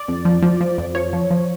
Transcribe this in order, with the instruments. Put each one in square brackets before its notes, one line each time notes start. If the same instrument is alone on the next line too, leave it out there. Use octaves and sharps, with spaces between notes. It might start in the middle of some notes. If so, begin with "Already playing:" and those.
Already playing: [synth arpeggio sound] D5
F2
F3
F3
F3
F2
F3 C#5
F3
F3